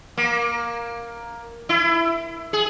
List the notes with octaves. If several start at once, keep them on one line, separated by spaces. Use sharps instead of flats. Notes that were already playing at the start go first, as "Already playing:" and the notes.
A#3
E4
G#4